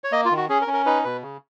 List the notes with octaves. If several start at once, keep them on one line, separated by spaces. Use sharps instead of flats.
C#5
A#3 D#5
F4
D#3
F#4
C#4 G#4
A#4
C#4
A#4
D#4 B4
B2 B4
C#3